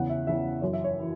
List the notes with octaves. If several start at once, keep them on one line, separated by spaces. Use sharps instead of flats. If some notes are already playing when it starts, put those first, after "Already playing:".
Already playing: E2 C#3 E3 F#5
E5
E2 C#3 E3 E5
F#2 E3 C#5
E5
C#5
E3